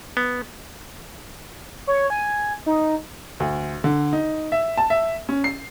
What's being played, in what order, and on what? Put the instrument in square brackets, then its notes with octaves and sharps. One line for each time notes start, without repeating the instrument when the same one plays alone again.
[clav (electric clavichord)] B3
[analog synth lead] C#5
G#5
D#4
[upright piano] D2
D3
D#4
E5
A5
E5
C#4
C7